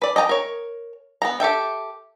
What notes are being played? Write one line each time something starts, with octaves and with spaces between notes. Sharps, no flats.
B4 D5
D#5 G5 A5 A#5
A#4 C#5
B3 G5 A#5
G4 A4 E5 G5